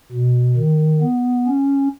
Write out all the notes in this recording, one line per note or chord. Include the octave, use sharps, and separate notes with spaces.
B2
D#3
B3
C#4